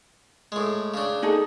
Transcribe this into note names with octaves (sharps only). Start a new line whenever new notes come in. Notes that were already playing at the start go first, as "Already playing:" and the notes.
A2 G#3
C#3 D4
D#4 G#4 A4